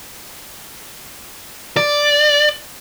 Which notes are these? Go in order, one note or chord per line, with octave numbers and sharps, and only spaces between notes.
D5